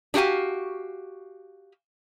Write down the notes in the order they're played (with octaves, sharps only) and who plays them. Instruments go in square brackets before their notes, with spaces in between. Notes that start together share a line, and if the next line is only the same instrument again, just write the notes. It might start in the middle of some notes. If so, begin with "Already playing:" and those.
[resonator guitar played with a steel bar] D4 F#4 G4 F5 G#5